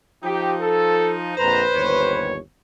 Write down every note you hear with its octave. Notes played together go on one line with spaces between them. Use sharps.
F3 D#4 G4
A4
A#1 F2 B4 C5 A#5
G1 D#2 C#5